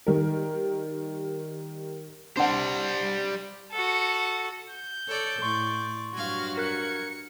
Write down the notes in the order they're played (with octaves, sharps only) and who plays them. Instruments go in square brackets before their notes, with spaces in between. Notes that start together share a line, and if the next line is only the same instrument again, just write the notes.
[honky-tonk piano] D#3 G3 A#4
[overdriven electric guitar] G3 C5 [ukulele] D4 F#5
[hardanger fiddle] F#4 A4
[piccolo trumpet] G6
[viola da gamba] A4 [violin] C#5 D5
[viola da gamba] A2 [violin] D5 [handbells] C6 C#6
[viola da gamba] G2 F#3 F#4 [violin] F5 G#6
[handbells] A#4 F#6 [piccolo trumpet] G#6 [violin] C#7